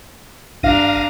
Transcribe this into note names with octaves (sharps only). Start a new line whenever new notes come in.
G#1 G2 D4 F5 A#5 A#6 D#7